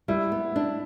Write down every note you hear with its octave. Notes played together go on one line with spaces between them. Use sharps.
G3 E4
B3
D4